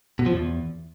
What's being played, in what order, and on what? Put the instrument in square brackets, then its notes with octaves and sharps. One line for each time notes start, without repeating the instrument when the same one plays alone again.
[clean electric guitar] B2
F3
E2